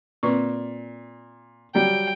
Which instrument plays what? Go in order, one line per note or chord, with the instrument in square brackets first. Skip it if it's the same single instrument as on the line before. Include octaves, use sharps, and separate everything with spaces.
[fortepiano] A#2 [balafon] C4 B4 C#6
[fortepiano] F#3 G3 [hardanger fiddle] G5